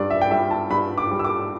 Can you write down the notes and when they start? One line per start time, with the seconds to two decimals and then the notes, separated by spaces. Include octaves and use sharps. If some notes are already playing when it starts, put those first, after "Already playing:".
Already playing: G2 G3 D5
0.10 E5
0.21 G5
0.31 G3 E5
0.51 A5
0.70 G2 B5
0.98 D6
1.11 G3
1.19 E6
1.24 D6